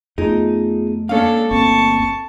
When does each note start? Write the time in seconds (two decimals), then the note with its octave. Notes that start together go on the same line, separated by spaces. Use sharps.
0.18 F2 A3 B3 D#4 F4 G#4
1.09 G#3 A#3 C#4 D4 A4 F5
1.51 G1 D2 A#3 C4 A5 C#6